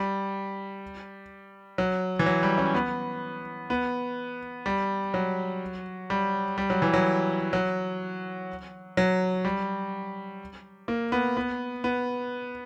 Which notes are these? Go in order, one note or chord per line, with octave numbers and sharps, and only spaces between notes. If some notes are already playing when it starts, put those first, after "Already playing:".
Already playing: G3
F#3
E3
F#3
G3
C#4
B3
B3
G3
F#3
G3
G3
F#3
E3
F#3
F#3
F#3
G3
A#3
B3
B3
B3